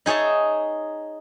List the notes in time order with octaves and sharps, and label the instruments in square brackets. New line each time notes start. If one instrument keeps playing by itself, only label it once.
[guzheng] D#4 G#4 C#5 E5 A5